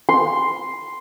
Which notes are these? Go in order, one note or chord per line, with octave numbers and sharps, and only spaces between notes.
C6